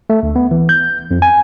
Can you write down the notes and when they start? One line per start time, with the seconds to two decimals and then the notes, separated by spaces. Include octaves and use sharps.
0.10 A3
0.23 D2
0.36 B3
0.51 E3
0.69 G6
1.11 F2
1.22 G#5